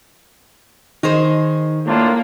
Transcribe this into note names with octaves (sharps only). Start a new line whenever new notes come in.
D#3 D#4 G#4 C5
A2 A#3 D4 F4